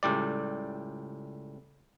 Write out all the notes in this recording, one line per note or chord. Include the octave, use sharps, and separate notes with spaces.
C#2 A2 G3 D5